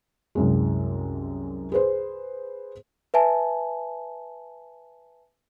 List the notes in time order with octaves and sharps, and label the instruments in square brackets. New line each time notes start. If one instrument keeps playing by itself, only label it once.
[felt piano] C2 F#2 G#3
G#4 B4 C5
[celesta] B4 E5 G#5 A5